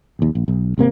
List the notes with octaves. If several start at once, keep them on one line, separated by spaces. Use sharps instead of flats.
A#1 D#2
A#1
B1
G#1 C3 A#3 C4